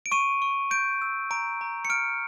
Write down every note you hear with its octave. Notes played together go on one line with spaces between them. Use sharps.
D7
C#6 D#7
C#6
G6 D7
E6
A#5 D7
A#5
C#7
F6 D7